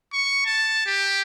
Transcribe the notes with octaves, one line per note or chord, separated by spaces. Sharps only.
C#6
A5
G4